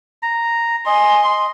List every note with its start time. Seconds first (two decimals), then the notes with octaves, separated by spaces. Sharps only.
0.23 A#5
0.86 D#5 G#5 C6